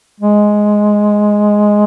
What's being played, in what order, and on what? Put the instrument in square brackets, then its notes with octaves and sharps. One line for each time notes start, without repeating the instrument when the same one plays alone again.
[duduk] G#3